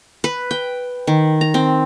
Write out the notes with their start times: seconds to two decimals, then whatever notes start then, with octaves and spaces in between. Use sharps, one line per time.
0.24 B4
0.51 G5
1.07 D#3
1.41 A#5
1.54 C4